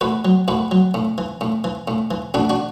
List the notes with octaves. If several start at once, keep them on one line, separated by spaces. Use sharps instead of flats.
A2 F#4 B4
F#3
A2 F#4 B4
F#3
A2
E3
A2
E3
A2
E3
A2 D4 F#4
D4 F#4